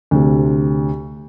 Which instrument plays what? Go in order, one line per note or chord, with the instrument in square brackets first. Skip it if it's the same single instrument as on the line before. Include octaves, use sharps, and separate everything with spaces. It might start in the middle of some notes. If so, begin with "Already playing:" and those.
[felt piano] D2 C3